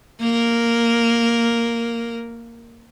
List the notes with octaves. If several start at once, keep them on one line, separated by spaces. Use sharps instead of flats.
A#3 A#4